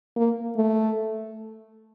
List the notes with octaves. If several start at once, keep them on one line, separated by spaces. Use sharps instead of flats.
A#3
A3